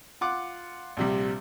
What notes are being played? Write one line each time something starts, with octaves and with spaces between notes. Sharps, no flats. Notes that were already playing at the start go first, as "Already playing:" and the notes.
F4 F#5 D6
A#1 C3 G3